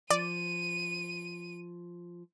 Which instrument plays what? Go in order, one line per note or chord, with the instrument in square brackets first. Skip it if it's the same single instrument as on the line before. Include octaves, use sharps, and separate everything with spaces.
[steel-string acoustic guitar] F3 [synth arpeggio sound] D5 [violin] D#7